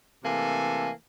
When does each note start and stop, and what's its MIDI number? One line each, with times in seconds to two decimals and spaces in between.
0.24 0.91 48
0.24 0.91 52
0.24 0.91 57
0.24 0.91 58
0.24 0.91 69
0.24 0.91 80